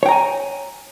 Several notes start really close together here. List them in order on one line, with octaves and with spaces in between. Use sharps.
C#5 G5 A#5 G#5